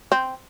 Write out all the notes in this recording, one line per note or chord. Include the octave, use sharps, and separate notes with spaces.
C4